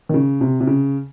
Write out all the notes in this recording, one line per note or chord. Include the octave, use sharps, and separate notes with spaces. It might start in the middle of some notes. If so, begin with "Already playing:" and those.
D#3
C#3
C3
C3
C#3